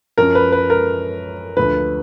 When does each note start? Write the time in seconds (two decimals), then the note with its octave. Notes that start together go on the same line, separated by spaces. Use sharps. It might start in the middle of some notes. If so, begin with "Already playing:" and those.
0.18 F#2 F3 A#4
0.35 B4
0.52 B4
0.70 A#4
1.57 D2 D3 F3 B4